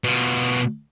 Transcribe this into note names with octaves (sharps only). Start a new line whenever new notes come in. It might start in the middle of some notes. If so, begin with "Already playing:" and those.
B2 F4